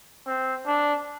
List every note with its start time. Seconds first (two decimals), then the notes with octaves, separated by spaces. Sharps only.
0.27 C4
0.66 D4